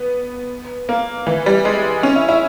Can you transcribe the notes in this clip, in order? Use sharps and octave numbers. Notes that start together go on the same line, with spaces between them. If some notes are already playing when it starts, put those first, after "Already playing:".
Already playing: B3
A#3
E3
G3
G#3
C#4
E4
E4